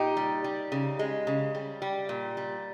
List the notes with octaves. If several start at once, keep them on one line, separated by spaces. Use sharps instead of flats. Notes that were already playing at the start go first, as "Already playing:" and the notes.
Already playing: A#2 D#4 G4
G3
G3
C#3
G#3
C#3
G3
G3
A#2
G3